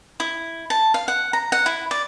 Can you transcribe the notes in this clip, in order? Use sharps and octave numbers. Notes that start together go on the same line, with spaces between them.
E4
A5
F5
F#5
A#5
F#5
E4
D5